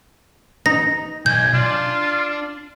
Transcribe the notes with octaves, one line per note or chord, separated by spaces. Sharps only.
D#4 A#6
B1 D#5 G#5 G6
D4 F4